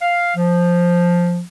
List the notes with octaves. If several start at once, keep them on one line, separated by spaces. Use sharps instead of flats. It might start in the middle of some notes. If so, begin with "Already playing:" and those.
F5
F3